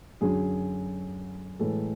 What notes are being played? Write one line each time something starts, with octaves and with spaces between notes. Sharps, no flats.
F#2 D3 F#3 G#4
A2 E3 G#3 A4